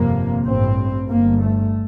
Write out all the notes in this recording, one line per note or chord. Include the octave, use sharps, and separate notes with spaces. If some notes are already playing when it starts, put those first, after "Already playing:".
Already playing: G1 F2 C3 A#3
A1 G2 C4
G1 G2 A#3
A3